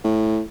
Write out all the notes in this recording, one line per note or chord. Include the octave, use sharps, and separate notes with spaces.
A2